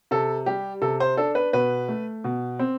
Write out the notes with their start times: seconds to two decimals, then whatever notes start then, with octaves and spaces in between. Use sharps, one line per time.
0.11 C3 A4
0.46 G3 G4
0.82 C3 A4
1.00 C5
1.17 D4 A4
1.35 B4
1.53 B2 B4
1.88 A3
2.24 B2
2.59 C4